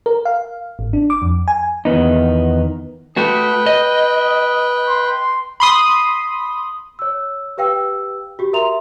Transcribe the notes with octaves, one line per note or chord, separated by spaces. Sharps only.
A#4
F5
G#1
D4
D6
F2
G#5
E2 D#3 B3 D#4
A3 F#4 B4 G5 D#6
D#5
C6
B5 C6 D#6
C#5 E6
G4 B4 F5 G5 E6
F#4 G4
A#4 E5 A#5 C6 F7